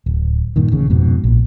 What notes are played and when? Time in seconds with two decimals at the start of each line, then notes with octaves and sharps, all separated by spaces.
0.06 D1
0.56 G2 A#2 D3 D#3
0.72 A1 C#3
0.90 F2 G#2 B2
1.23 A#1 A#2